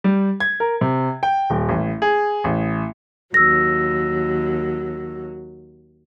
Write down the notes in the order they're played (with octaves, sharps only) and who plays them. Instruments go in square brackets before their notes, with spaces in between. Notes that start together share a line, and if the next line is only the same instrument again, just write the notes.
[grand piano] G3
G#6
A#4
C3
G5
D#1
A1
G#4
A1
[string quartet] D#2 F#3 [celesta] E6 A#6